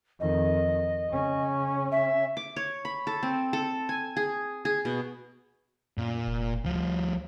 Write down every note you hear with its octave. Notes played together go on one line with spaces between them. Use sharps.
F2 D#3 D#5
C#3 C#4
E5
D6
C#5
B5
A4
C4
A4
G#5
G#4
G#4
B2
F#2 A#2
F1
D2 F3 G3